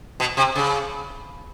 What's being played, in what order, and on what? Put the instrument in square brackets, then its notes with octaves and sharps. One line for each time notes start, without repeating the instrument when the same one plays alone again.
[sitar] B2
C3
C#3